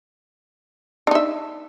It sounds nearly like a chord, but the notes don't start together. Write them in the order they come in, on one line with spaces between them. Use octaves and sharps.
D4 D#4 E5